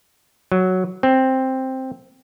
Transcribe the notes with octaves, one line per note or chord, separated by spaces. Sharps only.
F#3
C4